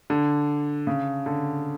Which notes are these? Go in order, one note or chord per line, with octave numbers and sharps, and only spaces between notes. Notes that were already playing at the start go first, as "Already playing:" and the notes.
D3
C#3
D3